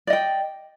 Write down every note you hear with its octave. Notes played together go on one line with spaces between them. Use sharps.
D5 D#5 G5